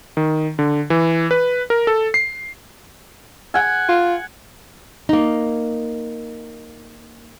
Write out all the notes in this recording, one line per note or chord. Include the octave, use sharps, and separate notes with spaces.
D#3
D3
E3
B4
A#4
A4
C7
F#5 G#5
F4
A#3 D#4